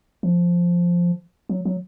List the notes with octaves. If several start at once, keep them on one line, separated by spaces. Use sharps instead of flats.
F3
F#3
F#3